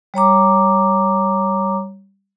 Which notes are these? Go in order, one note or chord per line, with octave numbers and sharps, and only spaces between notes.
G3 C#5 A#5 D6